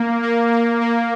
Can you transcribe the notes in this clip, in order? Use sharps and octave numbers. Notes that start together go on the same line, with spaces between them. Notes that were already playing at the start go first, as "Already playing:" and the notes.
Already playing: A#3
A#3
A#3
A#3